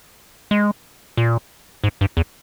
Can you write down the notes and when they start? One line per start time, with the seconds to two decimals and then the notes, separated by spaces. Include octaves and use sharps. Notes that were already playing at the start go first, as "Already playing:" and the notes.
0.51 G#3
1.17 A#2
1.84 G#2
2.01 G2
2.17 E2